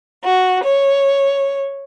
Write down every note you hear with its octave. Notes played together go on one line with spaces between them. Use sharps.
F#4
C#5